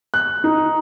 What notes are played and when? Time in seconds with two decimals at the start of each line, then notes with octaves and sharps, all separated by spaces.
0.14 F#6
0.44 D#4